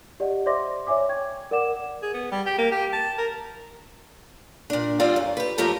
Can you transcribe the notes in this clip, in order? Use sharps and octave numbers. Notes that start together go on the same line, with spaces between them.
G4 D5 D#5 F#5
C5 D5 E5 C6 D6 A#6
C#5 E5 G#5 D6
G5 C#6 G#6
A#4 D5 F#5 D6 E7
G#4
B3
G3
G4
A#3
G4
A5
A#4
A#2 D4
G3 C4 F4 D5 F#5
F#2
G4 B4
F#2 F3 A3 G4 A#4 D#5